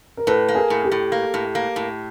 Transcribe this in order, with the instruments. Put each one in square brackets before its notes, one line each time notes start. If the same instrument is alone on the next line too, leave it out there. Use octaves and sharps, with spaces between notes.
[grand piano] A#4
[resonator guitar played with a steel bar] A2 [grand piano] A4 B4
[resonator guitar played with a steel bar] A#3
[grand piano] G#4 A#4
[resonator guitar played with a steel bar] A2
[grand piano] G4 A4
[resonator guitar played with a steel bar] A2
A#3
A2
A#3
A2